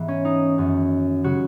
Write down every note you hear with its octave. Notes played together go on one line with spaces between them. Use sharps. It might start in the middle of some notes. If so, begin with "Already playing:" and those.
Already playing: G#2 E3 B3
C#4
D#4
F#2 D#3 F#3
C#3 F#3 F#4